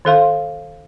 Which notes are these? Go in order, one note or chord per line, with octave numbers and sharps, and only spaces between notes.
D#3 A4 F5 C6